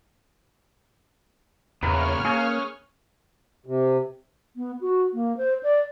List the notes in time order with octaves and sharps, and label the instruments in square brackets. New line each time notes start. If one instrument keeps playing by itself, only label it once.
[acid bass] E2 [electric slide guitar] A#2 C#3 B3 [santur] A#4 B4 [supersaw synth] C#5 F6
[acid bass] A#3 [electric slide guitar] C#4 [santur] G#4
[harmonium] C3
[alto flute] B3
F#4
A#3
C5
D5